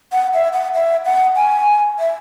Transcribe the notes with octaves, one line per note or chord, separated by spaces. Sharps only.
F#5
E5
F#5
E5
F#5
G#5
E5